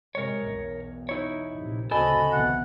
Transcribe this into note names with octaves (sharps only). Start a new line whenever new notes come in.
C3 G#3 A#4 C#5
B1 E2
D#4 E4 C#5
A#1 C3
D2 C#3 C4 F#4 A4 D#5 G#5 B5
B1 E3 B3 F#5